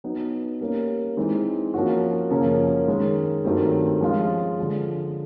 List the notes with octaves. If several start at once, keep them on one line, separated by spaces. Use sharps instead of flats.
F#3 B3 D#4
G3 A#3 C#4
E3 G#3 C4 D#4
F3 A#3 C#4 F#4
F#2 C#3 F3 A#3 C#4
D#3 G#3 C#4
G2 D#3 F#3 A3 C4
F3 G#3 C#4 F4
D3 F3 G#3